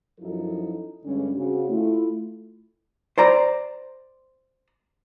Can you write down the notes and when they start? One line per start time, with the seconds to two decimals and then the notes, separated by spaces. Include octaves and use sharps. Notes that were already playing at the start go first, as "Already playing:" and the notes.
0.20 F#2 F3 D#4 E4 A4
1.05 G2 D3 G3 G#3 C#4
1.36 C#3 C4 F#4
1.69 A3 E4 F4
3.18 C5 D5 A#5